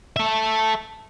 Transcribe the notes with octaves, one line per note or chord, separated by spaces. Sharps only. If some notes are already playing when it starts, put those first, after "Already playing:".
A4 E5